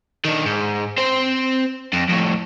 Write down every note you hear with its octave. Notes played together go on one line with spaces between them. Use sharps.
D#3 D4
G#2
C4 C5
F2
F2 A2